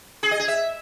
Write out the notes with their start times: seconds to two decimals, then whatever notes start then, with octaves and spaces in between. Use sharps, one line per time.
0.23 G#4
0.31 D#5
0.40 G#4
0.48 E5